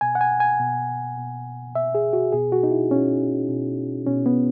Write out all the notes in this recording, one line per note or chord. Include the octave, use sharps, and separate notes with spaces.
B2 G#5
F#5
G#5
G#5
B2
B2
B2 E5
G#4
F#4
B2 G#4
F#4
D#4
E4
B2 C#4
B2
B2 C#4
B3